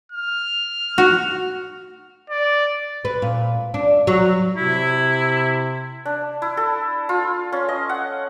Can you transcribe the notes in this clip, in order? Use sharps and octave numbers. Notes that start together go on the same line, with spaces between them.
F6
F#4
D5
B4
A#2
D4
F#3
C3 E4
D4
E4
A4
F4
C#4
D#5
F#5